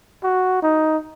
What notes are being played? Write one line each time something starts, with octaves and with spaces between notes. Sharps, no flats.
F#4
D#4